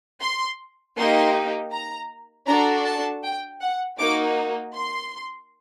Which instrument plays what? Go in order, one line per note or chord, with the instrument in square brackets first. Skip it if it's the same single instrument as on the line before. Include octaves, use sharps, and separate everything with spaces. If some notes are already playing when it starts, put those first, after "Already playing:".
[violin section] C6
A#3 D#4 G4 C6
A#5
D4 F#4 A4 A#5
A5
G5
F#5
A#3 D#4 F#4 D6
C6